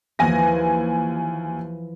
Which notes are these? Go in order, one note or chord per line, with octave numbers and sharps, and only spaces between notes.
D#2 E3 F3 G#5 A#6